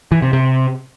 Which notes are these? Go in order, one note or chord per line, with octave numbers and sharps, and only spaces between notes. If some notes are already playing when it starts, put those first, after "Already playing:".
E3
C3
C3